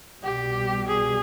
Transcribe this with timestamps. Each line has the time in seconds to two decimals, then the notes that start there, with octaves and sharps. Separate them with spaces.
0.23 C2 B2 G3 G4
0.87 G#4